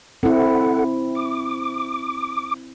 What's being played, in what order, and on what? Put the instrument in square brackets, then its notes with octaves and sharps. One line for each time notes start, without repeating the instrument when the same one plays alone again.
[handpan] C4 E4 [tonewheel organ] A4 F#5
[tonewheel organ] D6